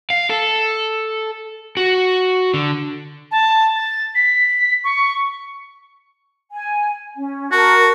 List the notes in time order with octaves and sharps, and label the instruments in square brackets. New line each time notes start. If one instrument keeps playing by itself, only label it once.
[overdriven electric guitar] F5
A4
F#4
D3
[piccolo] A5
A6
B6
C#6
[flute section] G#5
C#4
[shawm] F#4 [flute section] A#4 A5